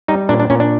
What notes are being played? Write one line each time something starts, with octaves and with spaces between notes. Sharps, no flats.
G3 D#4
A#2 D4
D4
A#2 C#4
D4